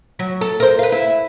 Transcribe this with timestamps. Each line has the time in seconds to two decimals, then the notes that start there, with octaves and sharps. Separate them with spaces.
0.19 F#3
0.41 A4
0.60 A#4 C5
0.79 B4 F5
0.92 E4